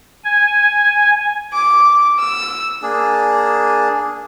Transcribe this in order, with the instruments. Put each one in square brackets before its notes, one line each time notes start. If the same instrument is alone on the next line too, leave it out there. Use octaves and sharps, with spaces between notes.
[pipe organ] G#5
[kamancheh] D6
E6
[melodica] A#3 D4 G#4